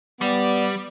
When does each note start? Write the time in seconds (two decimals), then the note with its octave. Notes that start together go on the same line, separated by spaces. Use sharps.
0.21 G3 B3 D5